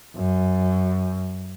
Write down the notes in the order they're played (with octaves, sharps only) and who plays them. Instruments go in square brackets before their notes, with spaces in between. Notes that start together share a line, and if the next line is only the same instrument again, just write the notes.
[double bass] F#2